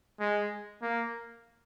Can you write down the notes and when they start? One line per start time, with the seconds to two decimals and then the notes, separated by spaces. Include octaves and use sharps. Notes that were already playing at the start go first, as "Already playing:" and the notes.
0.20 G#3
0.82 A#3